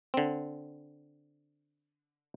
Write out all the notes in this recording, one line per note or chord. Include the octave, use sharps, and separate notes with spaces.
D3 C4